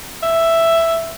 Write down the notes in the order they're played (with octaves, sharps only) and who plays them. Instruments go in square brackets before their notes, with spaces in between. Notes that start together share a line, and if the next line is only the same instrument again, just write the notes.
[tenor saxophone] E5